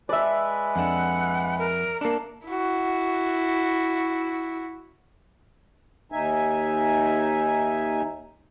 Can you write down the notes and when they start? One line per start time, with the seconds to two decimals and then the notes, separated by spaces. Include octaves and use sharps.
0.09 G#3 B4 D5 E5
0.76 F2 D4 F#5
1.59 A#4
2.01 A#3 D4 A5
2.47 E4 F#4
6.12 D#2 D#4 E5 G#5